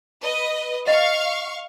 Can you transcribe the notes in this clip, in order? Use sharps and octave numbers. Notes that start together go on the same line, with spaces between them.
B4 D#5
D#5 F5 C#6